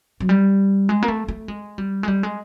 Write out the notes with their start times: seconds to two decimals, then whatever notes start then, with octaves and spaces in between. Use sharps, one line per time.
0.20 F#3
0.29 G3
0.89 G#3
1.03 A#3
1.08 A3
1.28 A3
1.48 G#3
1.78 G3
2.03 G#3
2.08 G3
2.23 G#3